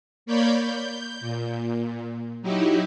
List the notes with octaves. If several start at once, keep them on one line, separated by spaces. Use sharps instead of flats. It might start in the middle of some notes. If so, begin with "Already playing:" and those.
A#3 C#5 D5 B5 G6
G6
A#2
F#3 D#4 E4 G4